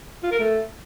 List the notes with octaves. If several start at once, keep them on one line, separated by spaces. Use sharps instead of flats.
F4
A#4
A3